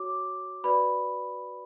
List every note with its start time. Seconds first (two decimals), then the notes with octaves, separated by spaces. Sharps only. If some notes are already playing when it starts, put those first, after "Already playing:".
Already playing: F#4 C#5 D6
0.63 F#4 B4 D5 B5